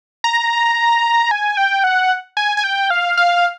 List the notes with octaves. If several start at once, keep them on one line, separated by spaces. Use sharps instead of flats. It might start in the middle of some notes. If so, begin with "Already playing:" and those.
A#5
G#5
G5
F#5
G#5
G#5
G5
F5
F5